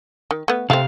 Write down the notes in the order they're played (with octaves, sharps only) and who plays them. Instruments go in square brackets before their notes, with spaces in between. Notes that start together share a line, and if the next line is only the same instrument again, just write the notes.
[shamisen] D#3
A3 B3
[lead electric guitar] C3 F5 [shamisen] A3 C4